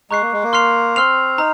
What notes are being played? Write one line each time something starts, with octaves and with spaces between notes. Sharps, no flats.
G#3 A#5 C#6 F#6 C7
A#3
G#3
A#3
C6 F6 C7 F7
C4 C6 F6 C7 F7
D#4 A#5